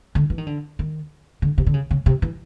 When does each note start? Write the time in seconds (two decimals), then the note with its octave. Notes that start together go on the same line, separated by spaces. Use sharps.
0.15 D3
0.30 E3
0.38 D#3
0.47 D3
0.79 D#3
1.42 D3
1.58 C3
1.67 D3
1.74 C#3
1.91 C#3
2.06 C3
2.22 E3